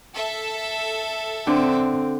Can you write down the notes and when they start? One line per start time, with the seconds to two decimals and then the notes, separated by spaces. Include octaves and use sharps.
0.15 A4 E5
1.47 D3 C4